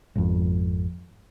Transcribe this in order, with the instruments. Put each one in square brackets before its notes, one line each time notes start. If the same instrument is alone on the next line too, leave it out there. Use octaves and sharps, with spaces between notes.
[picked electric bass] G#1 F2